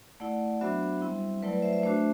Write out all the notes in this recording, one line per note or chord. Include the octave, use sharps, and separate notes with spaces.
A3 E4 D5 F#5
F#3 B3 D4 F#4 C5 E5
G3 C4 E4
F#3 A3 E4 B4 D5
B4 D5
C5 E5
C5 E5
A3 D4 F#4 C5 E5